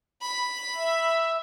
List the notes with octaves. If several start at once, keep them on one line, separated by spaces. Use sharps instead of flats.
B5
E5